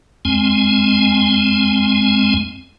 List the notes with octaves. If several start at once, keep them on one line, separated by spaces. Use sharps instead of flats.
F2 G#3 C4 G#5